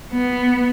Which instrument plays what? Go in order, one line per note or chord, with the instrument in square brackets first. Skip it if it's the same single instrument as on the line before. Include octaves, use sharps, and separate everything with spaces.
[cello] B3